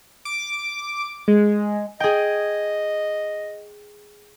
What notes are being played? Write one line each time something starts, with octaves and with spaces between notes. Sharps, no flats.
D6
G#3
G#4 D#5 G5